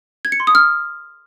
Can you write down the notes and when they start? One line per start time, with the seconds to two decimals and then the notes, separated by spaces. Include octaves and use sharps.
0.25 G#6
0.32 C#7
0.40 C6
0.47 D#6
0.55 F6